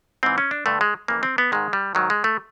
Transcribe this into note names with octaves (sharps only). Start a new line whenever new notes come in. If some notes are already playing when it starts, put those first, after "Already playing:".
G#2 E3 C4
C#4
D4
G2 D3 A3
G#3
F2 C#3 E3 A#3
C4
B3
G#2 D#3 G#3
G3
G#2 D#3 F#3
G#3
A3